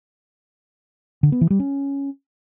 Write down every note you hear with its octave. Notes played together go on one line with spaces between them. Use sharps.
D3
B3
E3
G3
C#4